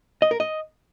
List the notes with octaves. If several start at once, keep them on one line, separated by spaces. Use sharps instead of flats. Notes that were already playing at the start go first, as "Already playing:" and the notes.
D#5
A#4
D#5